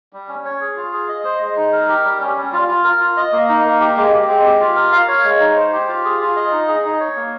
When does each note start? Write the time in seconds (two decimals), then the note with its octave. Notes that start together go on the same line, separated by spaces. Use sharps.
0.13 G3
0.29 C#4
0.45 C#5
0.61 G#4
0.77 F4
0.93 G#4
1.09 D#5
1.24 C5
1.40 G#3
1.56 D#4
1.73 A#4
1.88 G4
2.04 G3
2.21 C#4
2.37 G3
2.53 F4
2.68 F4
2.84 A#4
3.00 F4
3.17 D#5
3.32 A#3
3.49 D#4
3.65 A#3
3.80 G4
3.97 G#3
4.13 C4
4.29 G#3
4.44 G4
4.60 F4
4.76 A#4
4.92 F5
5.08 C#5
5.24 G#3
5.40 D#4
5.56 C5
5.73 G4
5.88 F4
6.04 G#4
6.21 F4
6.36 D#5
6.52 D#4
6.68 G#4
6.85 D#4
7.00 C#5
7.16 A#3